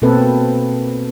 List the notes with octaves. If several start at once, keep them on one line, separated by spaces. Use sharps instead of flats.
B2 A#3 C4 A4 B4